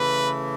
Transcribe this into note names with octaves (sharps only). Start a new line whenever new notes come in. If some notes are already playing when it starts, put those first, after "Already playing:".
Already playing: C#3 E3 A3 B4